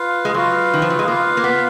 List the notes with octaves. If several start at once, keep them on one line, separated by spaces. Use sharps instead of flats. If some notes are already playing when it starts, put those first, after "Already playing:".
Already playing: F4 B4 F5
G#3
F#3 F4 B4 F5
D#3
F3
F#3
G#3
A#3 F4 B4 F5
A#3
B3